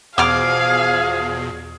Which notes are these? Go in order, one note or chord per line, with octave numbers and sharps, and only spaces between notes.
E2 B2 F3 G#4 F5 D6 F6